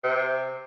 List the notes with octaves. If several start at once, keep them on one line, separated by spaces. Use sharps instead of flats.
C3